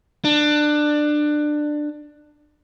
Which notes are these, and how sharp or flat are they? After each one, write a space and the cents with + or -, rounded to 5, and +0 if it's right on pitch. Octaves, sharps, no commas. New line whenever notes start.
D4 +20